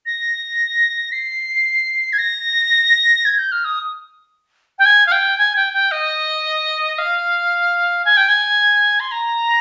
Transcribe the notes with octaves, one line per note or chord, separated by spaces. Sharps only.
A#6
C7
G#6
A#6
G#6
G6
F6
D#6
G5
G#5
F5
G5
G#5
G5
G5
D#5
F5
G#5
G5
G#5
C6
A#5